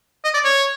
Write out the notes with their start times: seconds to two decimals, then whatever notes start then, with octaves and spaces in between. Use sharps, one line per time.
0.24 D#5
0.34 D5
0.44 C#5